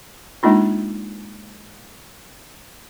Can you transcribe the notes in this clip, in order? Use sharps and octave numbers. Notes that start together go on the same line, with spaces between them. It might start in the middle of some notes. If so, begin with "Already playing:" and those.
G#3 A#3 D4 D#4 F4